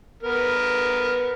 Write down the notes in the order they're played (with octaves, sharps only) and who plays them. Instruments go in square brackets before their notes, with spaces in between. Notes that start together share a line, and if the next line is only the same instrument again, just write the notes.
[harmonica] B3 A#4